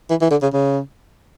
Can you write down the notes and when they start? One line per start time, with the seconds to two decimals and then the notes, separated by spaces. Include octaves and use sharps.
0.10 E3
0.21 E3
0.31 D3
0.43 C#3
0.53 C#3